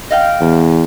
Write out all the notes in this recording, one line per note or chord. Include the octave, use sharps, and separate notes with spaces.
D#5 F5 G5
E2